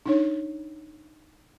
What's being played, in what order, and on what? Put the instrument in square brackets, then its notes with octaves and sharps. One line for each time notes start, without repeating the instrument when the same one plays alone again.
[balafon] D4 D#4 C#5